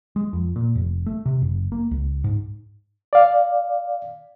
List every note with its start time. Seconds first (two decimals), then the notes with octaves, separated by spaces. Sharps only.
0.16 G#3
0.33 F2
0.56 A#2
0.76 F1
1.06 A3
1.26 C3
1.42 F#1
1.72 A#3
1.91 C#2
2.24 G#2
3.13 D5 F5